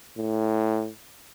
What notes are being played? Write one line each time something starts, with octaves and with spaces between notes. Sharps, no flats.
A2